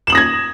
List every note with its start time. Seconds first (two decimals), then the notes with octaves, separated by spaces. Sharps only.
0.07 E7
0.10 F#7
0.12 D#6
0.15 A#6
0.17 G#6